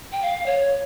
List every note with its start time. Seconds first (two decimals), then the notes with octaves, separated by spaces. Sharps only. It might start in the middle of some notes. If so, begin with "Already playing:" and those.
0.12 G5
0.22 F5
0.46 C#5